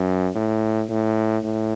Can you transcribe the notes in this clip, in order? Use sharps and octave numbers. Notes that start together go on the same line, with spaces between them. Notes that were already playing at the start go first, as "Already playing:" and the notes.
Already playing: F#2
A2
A2
A2